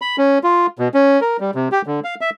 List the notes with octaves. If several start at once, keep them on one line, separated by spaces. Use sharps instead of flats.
B5
C#4
F4
B2
C#4
A#4
G3
C3
G4
D3
F5
E5